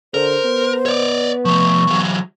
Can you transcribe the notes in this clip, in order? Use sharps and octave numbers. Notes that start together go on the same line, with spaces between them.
D3 A#4 C5
B3
C#5 D5
F3 A3 C#6
E3 F#3